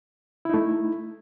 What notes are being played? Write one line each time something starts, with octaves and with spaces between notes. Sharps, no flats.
A3 D#4 E4